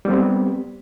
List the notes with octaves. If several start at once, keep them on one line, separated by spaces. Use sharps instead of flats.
G3 B3 C4